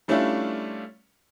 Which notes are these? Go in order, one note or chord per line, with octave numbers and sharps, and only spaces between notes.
G3 A3 C#4 D4 E4 F4